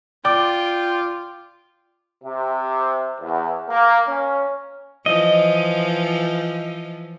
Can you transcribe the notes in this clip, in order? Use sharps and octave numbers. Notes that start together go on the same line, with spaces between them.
F4 D5 G5 D6
C3
E2
A#3
C#4
E3 F3 D#5